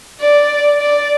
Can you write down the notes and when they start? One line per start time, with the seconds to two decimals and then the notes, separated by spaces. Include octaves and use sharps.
0.20 D5
0.81 D5